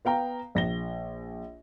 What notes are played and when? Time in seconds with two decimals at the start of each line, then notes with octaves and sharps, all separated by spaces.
0.05 B3 F5 G5 A#5
0.55 A#1 A#6 G7